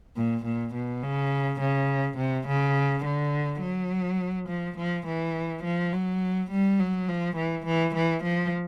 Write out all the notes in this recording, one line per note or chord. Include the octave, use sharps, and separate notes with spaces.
A#2
A#2
B2
C#3
C#3
C3
C#3
D3
F#3
F3
F3
E3
F3
F#3
G3
F#3
F3
E3
E3
E3
F3